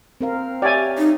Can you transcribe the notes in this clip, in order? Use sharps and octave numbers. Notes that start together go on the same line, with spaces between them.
C4 A#4 F5
G4 C#5 D5 E5 G#5
D#4